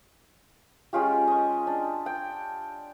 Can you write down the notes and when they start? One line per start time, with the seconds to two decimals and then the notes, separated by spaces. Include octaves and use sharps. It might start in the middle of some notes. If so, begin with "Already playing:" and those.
0.93 G#3 C#4 F4 G4
1.28 D#5 C#6
1.67 D4
2.06 G5